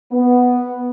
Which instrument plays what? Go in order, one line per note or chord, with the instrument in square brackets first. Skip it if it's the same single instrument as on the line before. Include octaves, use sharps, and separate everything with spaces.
[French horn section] B3